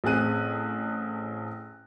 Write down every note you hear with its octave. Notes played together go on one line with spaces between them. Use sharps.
A1 C4 G#4 F#6 D#7